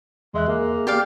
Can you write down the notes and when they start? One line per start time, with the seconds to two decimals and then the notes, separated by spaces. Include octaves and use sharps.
0.34 E2 G#3 E5 F#6
0.48 A#3 G#4
0.87 G4 D5 F5